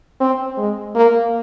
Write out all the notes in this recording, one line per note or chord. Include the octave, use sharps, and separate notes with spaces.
C4
G#3
A#3